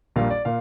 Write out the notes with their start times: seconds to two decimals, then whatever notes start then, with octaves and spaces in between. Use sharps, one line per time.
0.16 A#1 A#2 G3 F5
0.30 D5
0.45 A#2 F5